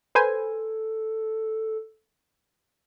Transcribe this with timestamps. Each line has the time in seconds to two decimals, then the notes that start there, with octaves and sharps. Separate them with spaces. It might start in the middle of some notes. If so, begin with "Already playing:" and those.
0.15 A4 B4 C5 G#5